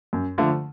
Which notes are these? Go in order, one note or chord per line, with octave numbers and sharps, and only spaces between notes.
F#2
D3 F3 A3